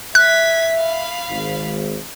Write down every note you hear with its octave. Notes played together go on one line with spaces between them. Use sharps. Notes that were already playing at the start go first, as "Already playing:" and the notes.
E5 F#6 G#6 B6
F5 B5
G#1